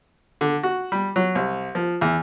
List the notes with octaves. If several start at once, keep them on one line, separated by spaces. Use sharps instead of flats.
D3
F#4
G3
F#3
C2
F3
E2